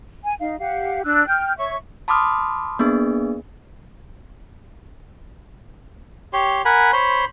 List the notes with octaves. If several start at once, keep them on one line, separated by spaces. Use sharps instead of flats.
G#5
D#4 F5
G4 F5 F#5
D4 E6 F#6
G5 F6 G6
C#5 E5 C#6
A5 B5 C6 D6 D#6 F6
A#3 B3 D4 G#4
G4 C#5 C6
A#4 F#5 G#5 B5
C5 C#5 B5 C6